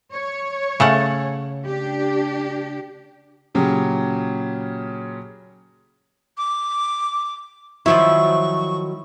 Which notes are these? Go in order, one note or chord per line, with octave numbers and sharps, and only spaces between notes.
C#5
C#3 A3 F#5
D4 G4
A#2 C#3 F#3 G4
D6
D#3 F3 F#3 E4 C#6